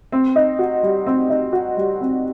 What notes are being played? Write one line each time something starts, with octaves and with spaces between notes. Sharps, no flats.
C4
D#4
F#4
G3
C4
D#4
F#4
G3
C4